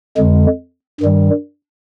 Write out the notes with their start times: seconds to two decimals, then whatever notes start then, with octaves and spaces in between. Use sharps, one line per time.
0.17 F2 D3 G#3
1.00 G2 D#3 G3